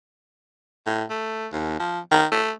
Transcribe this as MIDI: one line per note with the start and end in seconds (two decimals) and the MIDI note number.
0.87 1.04 45
1.10 1.47 57
1.52 1.75 39
1.79 2.00 53
2.11 2.26 51
2.32 2.51 57